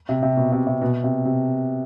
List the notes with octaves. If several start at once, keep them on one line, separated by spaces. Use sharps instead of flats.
C3
C3
B2
C3
C3
B2
C3
C3